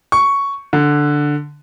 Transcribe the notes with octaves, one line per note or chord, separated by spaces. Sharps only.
C#6
D3